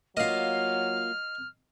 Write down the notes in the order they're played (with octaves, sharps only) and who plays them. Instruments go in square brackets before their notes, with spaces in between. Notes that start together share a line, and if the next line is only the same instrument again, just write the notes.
[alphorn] F#3 [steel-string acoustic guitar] A#3 F4 [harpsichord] D#5 F5 [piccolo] F6